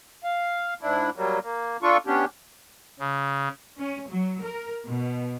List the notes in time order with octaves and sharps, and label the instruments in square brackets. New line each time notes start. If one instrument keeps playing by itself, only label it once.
[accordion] F5
G#2 D4 E4
F#3 G3 A#3
A#3
D4 F4 A4 C#6
B3 C#4 D4 G4
[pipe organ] C#3
[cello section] C#4
F#3
A#4
B2